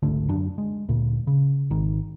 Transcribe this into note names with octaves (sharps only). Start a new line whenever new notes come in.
G#1 C#2 D3 A3
F#2 F#3 D4
G#3
D2 A#2
C#3
G#1 D#3